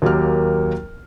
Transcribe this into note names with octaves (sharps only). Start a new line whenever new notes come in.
D#2 F#3 A#3 G4 F6